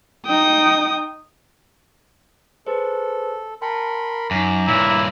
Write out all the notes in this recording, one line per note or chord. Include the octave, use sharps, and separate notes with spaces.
D#4 G5 D#6
G#4 A4 B4 C5
A#4 G5 A5 B5 C6 C#7
F#2 D#4 G#5 A#5 D6
G2 A#2 E4 C#5